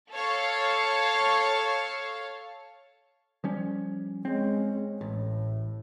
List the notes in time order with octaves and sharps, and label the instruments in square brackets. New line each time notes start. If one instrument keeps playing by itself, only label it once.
[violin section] A4 C#5 F5
[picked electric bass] F3 G3 C#4
[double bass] G#3 C#4 [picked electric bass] C4
[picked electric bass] A1 [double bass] A2